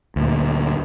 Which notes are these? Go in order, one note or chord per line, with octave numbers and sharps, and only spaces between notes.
D2 A#2